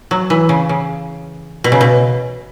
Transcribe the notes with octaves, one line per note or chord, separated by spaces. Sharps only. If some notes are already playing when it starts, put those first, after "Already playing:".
F#3
E3
C#3
C#3
B2
C#3
B2